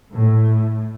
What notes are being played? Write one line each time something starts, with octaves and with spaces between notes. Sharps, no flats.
A2